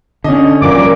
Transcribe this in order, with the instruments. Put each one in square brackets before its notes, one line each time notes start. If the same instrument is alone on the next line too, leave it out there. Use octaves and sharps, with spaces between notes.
[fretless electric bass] D3 [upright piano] C#4 D#5
[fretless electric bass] G2 F3 [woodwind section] A#2 D6